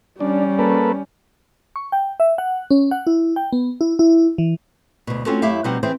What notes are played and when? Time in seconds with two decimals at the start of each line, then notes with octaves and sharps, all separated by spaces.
0.20 G3 C#4 D4
0.59 A#3 A4 B4
1.76 C#6
1.92 G5
2.20 E5
2.38 F#5
2.71 C#4
2.91 F#5
3.07 E4
3.36 G5
3.53 B3
3.81 E4
3.99 E4
4.38 E3
5.07 D2 B2
5.26 C4 C#4 F4 F#4 A4
5.42 F#2 A3 E4 G4 E5 F5
5.64 B2 F3 G3 C4 D#4 F#5
5.83 E3 C4 E4 G#4 C5